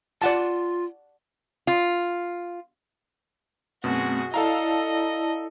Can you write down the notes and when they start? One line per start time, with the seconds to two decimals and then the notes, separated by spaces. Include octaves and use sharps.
0.22 F4 D5 F#5 A5
1.67 F4
3.84 F#2 B2 A3 C4 F#4 G#4
4.34 E4 A4 D5 D#5 F5 A5 A#5